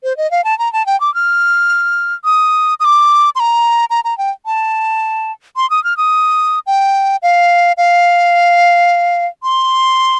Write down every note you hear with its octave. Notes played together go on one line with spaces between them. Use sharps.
C5
D#5
F5
A5
A#5
A5
G5
D6
F6
D#6
D#6
D6
C6
A#5
A#5
A#5
G5
A5
C6
D#6
F6
D#6
G5
F5
F5
C6